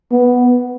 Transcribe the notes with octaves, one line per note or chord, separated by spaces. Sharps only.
B3